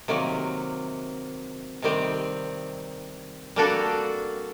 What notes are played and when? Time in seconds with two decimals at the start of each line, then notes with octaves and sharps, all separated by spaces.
0.08 C3 D#3 F#3 A#3
1.82 C3 D#3 G3 C4
3.56 G3 A#3 D4 F#4 A4